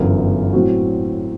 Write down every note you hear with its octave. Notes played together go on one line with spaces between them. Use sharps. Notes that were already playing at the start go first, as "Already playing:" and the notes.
Already playing: G1 F#2 E3 B3 E4
A2 F#3 C4 F#4